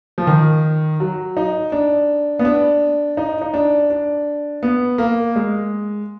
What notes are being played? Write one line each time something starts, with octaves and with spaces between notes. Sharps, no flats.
F3
D#3
F#3
D#4
D4
B3
D4
D#4
D#4
D4
D4
B3
A#3
G#3